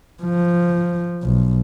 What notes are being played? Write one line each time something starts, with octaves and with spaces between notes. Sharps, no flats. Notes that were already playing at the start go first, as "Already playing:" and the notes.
F3
B1